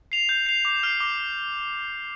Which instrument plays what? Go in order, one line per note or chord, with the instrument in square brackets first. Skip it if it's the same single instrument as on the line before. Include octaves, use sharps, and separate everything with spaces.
[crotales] C7 F7
G6
C7 F7
D6
F6 C7
D6